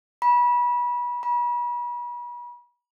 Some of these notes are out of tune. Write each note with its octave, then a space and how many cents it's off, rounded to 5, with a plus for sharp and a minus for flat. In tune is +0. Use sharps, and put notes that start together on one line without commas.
B5 -25
B5 -35